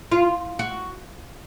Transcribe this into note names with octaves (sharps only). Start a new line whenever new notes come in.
F4
F#4